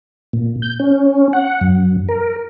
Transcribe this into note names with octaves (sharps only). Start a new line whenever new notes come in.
A#2
G6
C#4
F#5
F#2
A#4